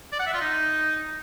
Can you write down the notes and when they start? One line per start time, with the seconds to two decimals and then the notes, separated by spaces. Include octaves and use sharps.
0.12 D5
0.19 F#5
0.27 E5
0.34 F4
0.41 D#4